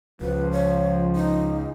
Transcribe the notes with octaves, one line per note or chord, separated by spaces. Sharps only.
C#2 F3 B4
C#5
D#4